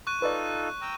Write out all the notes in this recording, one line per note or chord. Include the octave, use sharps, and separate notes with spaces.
C#6 F#6 D#7
D#4 F4 A4 B4 D5
G5 A#5 E6